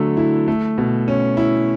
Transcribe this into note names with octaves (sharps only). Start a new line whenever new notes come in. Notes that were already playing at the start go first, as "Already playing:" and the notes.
Already playing: D3 F#3 A3
E4
A3
B2
C#4
E4